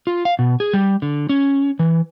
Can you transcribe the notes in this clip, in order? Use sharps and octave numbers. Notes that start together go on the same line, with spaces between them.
F4
F5
B2
G#4
G3
D3
C#4
E3